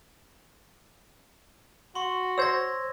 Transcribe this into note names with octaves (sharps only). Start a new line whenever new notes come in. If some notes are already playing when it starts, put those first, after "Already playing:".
F#4 C6 C#6
C5 C#5 E6 G#6 A#6